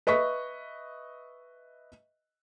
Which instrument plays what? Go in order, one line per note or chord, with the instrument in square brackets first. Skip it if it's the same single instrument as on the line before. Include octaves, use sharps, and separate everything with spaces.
[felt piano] B4 D#5 E5 C#6 B6